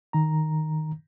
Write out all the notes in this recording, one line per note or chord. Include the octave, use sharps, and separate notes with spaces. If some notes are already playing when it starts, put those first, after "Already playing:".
D#3 A#5